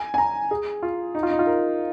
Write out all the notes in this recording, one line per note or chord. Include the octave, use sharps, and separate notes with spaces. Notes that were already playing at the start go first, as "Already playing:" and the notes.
Already playing: G#5
G#5
A#5
G#4
F4
D#4
F4
D#4
F4
A#4